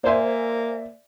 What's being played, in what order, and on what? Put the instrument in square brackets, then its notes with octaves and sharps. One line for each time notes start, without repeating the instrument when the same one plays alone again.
[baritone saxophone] A#3 [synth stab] C5 G#5 [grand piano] D5 E5